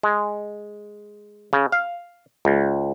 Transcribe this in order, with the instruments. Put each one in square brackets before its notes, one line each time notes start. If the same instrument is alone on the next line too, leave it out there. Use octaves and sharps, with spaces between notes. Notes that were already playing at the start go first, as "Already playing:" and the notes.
[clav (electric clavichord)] G#3
C#3
F5
C#2